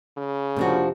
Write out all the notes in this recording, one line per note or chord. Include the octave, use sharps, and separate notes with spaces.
C#3
F2 C3 F3 A#3 D4 F#4